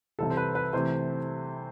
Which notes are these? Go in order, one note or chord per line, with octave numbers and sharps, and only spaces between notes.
C2 C3 E3 A4
C5
B4
B4
C3 E3 A3 C4 C5